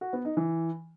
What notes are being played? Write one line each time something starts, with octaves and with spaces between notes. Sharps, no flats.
F#4
B3
D#4
E3